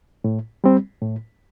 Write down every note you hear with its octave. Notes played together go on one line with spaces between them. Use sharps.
A2
G3 C4
A2